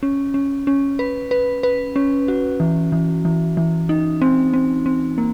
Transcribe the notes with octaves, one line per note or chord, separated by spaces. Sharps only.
C#4
C#4
C#4
B4
B4
B4
C#4
F#4
E3
E3
E3
E3
D#4
C4
C4
C4
A#3